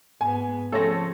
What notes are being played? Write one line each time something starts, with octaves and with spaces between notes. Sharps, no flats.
G#2 B3 G#5
C#3 F3 A3 C4 A4 C#5 A#6